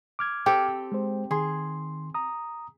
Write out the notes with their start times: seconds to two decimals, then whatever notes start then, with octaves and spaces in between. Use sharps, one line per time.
0.19 D6 F6 G#6
0.46 C4 G4 A4
0.92 G#3 C5
1.31 D#3 G#4 C6
2.14 A#5 D#6